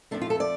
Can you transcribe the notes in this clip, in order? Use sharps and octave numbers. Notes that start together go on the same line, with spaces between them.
F2 F3 A3 D4
F4
A4
D5